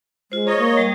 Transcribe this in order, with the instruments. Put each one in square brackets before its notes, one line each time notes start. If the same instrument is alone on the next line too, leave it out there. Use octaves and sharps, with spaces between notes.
[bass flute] G#3 [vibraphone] F4 C5
[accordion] C#5 D#5 [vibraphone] A#5 C#6
[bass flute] A#3
[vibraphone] G3